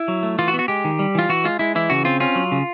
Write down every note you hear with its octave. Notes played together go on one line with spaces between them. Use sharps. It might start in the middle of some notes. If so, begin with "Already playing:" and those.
Already playing: E4
F#3
A3
E3 F4
F#4
B3
F#4
G#3 G4
D#3
G3
E3 F4
E3 F#4
G#3 F4
G#3 E4
E3 E4
C#3 F#4
C4 F4
C#4 F4
F#3
C#3